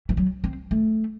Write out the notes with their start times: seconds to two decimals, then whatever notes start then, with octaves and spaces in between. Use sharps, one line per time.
0.09 E3
0.17 F#3
0.44 C4
0.71 A3